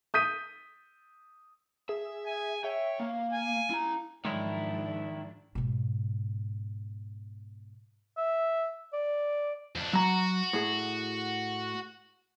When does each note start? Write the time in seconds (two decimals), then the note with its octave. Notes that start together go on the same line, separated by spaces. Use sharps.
0.14 D#6 G6 B6 D#7
1.89 G#4 E5
2.26 G#5
2.64 C#5 E5 G5
3.00 A#3 F5
3.32 G#5
3.70 E4 A#5
4.25 G#2 D#3 F3 F#3 G#3 D4 E4
5.55 G#2 B2
8.17 E5
8.93 D5
9.76 F2 D4
9.93 F#3 F#4 A#5
10.53 A2 G#4